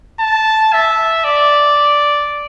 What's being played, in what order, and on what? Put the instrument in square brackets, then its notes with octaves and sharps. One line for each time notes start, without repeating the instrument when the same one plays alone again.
[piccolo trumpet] A5
E5
D5